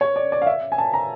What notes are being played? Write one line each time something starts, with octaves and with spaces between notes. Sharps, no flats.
C#5
D5
D5
F5
E5
G#5
A5
A#5